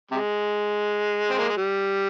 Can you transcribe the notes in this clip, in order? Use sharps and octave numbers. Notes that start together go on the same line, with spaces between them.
C3 G#3
C4
A#3
G#3
G3